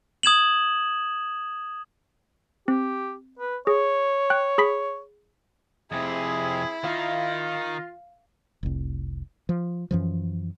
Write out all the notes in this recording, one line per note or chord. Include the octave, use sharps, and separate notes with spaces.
D#6 G#6 E7 F#7
C4 G4
B4
G#4 C#5
G5 F#6
G#4 B5 B6
F2 C3 C4 E4 G#4
D#3 D#4 F4 F5
F1 C2
F3
F#2 E3 F3